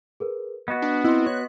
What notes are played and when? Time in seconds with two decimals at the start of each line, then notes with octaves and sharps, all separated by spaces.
0.20 G#4 A#4 B4
0.68 B3 F#4 D#5 F#6 C#7
0.82 D4
1.04 C4 E4 D#5 C6
1.26 C#5 F#6